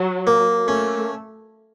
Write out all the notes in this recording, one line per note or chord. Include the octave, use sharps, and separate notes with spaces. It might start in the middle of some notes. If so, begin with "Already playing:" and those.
Already playing: F#3
A#3
A3 C#4